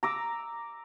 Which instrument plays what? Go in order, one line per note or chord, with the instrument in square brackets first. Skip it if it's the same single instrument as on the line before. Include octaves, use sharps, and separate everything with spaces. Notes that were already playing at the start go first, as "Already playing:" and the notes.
[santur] A#5 D6 E6